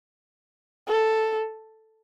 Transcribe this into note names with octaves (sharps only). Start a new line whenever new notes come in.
A4